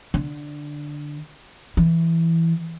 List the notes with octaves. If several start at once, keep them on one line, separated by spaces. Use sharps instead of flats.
D3
E3